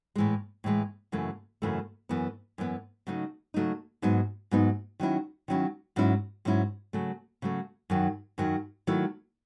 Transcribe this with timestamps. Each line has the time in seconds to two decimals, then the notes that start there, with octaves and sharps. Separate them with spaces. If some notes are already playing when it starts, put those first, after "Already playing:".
0.16 A2 E3 G#3
0.64 A2 E3 G#3
1.12 F#2 C#3 E3 A3
1.62 F#2 C#3 E3 A3
2.09 F#2 E3 B3
2.58 F#2 E3 B3
3.07 C#3 F#3 A3 D#4
3.54 C#3 F#3 A3 D#4
4.02 G#2 F#3 B3 D#4
4.51 G#2 F#3 B3 D#4
5.00 D#3 F#3 C#4 E4
5.48 D#3 F#3 C#4 E4
5.96 G#2 F#3 C#4 E4
6.45 G#2 F#3 C#4 E4
6.93 C#3 F#3 A3
7.42 C#3 F#3 A3
7.90 F#2 D#3 F#3
8.38 F#2 D#3 F#3
8.87 D#3 F#3 A3 E4